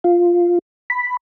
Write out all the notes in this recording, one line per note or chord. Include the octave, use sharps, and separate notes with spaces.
F4
B5